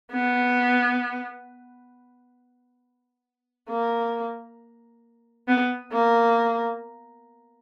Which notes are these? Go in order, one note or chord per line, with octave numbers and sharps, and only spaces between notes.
B3
A#3
B3
A#3